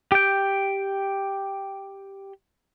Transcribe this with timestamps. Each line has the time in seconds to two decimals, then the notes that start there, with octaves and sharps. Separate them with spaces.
0.12 G4 G5